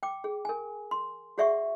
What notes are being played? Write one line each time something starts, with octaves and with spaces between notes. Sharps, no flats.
G5 D6
G#4
A#4 G#5
C6
F#4 G#4 D5 E5 F#5 C#6